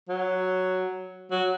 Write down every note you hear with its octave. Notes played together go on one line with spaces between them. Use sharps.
F#3
F#3